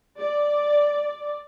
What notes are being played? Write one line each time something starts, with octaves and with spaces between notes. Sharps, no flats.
D5